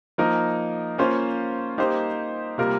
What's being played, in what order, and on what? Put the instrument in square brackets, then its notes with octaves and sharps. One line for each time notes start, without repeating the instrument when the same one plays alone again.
[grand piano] F3 A#3 D#4 A#4
A#3 C#4 F4 C5
A#3 D#4 G4 C5
C3 G3 A#3 F4 A#4